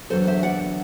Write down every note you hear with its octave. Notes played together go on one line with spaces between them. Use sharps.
E2 D3 F#3 A4 C5
C5 E5
D5 F#5